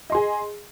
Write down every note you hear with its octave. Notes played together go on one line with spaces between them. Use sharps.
G#4 D#5 C6